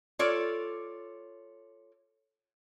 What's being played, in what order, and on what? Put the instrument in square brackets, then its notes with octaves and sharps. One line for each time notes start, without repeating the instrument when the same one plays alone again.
[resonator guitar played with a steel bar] F4 A4 C#5 D5